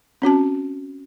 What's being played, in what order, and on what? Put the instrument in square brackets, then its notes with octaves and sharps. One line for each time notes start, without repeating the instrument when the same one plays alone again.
[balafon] C4 C#4 F#4 A5